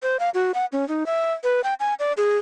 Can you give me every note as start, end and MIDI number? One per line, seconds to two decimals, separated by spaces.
0.03 0.17 72
0.20 0.30 77
0.34 0.52 66
0.54 0.66 78
0.72 0.87 61
0.88 1.06 63
1.06 1.33 76
1.44 1.61 71
1.64 1.74 79
1.80 1.94 80
1.99 2.13 74
2.17 2.37 68